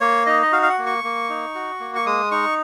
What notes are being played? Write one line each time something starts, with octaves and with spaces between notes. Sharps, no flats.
A#3 C#5
D#4 D#5
D#5
F#4 F5
F5
F#5
A#3
C#6
A#3
D#4
F#4
A#3
C#6
G#3 D#6
D#4 C#6